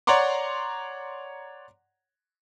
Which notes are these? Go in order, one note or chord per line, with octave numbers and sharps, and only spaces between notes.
C#5 D5 F#5 A#5 C6 D6